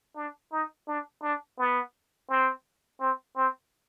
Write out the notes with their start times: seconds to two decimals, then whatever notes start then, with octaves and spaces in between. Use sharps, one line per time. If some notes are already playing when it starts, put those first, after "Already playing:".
0.16 D4
0.52 D#4
0.88 D4
1.22 D4
1.58 B3
2.29 C4
3.01 C4
3.36 C4